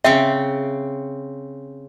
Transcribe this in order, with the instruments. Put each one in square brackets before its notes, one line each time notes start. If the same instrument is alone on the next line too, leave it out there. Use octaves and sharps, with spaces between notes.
[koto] C#3 C4 [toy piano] E5